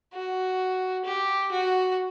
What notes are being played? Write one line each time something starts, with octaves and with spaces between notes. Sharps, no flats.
F#4
G4
F#4